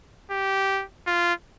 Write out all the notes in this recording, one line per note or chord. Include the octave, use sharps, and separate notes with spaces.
G4
F4